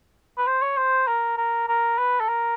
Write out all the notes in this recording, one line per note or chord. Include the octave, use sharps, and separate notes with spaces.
B4
C5
C#5
C5
A#4
A#4
A#4
B4
A4
A#4